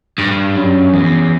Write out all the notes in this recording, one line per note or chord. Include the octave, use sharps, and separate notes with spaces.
G2
F#2
E2